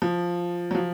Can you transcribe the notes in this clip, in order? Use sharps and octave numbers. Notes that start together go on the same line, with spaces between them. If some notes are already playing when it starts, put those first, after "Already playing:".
F3
F#3
F3